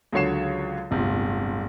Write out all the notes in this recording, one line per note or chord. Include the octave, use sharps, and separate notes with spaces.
C#2 D3 F#3 C#5 C7 E7
D1 G1 C3 F4